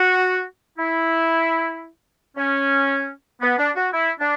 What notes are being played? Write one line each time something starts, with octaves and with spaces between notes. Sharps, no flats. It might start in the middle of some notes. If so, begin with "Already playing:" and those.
Already playing: F#4
E4
C#4
B3
D4
F#4
E4
D4